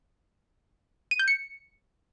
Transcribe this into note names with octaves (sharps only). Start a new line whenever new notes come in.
D#7
G6
C#7